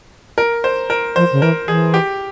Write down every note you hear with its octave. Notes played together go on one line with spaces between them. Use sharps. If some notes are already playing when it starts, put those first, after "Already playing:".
A#4
C5
A#4
F3 C5
C#3
E3 A#4
E3 G#4
G4